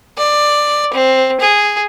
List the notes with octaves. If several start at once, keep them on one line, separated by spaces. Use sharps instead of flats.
D5
C4
G#4